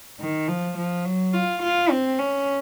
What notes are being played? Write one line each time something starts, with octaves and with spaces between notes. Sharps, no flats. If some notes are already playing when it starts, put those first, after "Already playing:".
D#3
F3
F3
F#3
F4
F4
C4
C#4